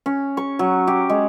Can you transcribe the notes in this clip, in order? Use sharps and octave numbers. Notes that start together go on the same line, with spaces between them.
C#4
C#6
F#3
G4
G#3